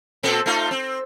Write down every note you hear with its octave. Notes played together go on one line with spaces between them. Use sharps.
A#2 C4 A4
A3 D#4 F4
C4